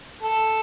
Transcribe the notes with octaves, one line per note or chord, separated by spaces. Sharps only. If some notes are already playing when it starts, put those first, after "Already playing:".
A4